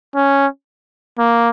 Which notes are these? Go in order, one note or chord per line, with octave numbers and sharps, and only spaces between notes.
C#4
A#3